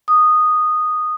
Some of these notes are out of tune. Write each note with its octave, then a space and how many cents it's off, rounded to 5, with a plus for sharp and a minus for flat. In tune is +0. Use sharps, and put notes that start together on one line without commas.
D#6 -10